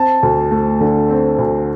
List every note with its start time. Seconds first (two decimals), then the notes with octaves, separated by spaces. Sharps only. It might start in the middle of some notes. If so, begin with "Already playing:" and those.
Already playing: C4 A5
0.23 D2
0.51 A3
0.81 D3
1.10 C4
1.39 D2